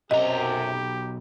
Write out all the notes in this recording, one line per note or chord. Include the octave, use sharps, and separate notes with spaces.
B1 F#2 C3 G4 D#5 A#5